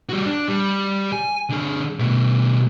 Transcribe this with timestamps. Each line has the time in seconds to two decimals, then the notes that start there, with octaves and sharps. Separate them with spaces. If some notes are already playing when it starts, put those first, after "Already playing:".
0.09 G3 F#4
0.26 D4
0.48 G3
1.12 G#5
1.50 D3 G#4
1.99 B2 A3